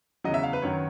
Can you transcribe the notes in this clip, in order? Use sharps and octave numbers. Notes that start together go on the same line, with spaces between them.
E2 C#3 F#3 D#5
E5
F5
B4
F#2 D#3 F#3 C#5